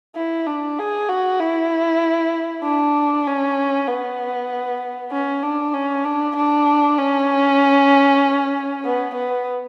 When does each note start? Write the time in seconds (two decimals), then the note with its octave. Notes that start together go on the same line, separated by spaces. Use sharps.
0.16 E4
0.46 D4
0.78 G#4
1.09 F#4
1.40 E4
2.63 D4
3.27 C#4
3.87 B3
5.11 C#4
5.43 D4
5.74 C#4
6.05 D4
6.36 D4
6.98 C#4
8.85 B3
9.16 B3